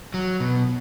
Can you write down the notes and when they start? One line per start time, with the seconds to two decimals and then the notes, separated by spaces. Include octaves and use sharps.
0.14 F#3
0.40 B2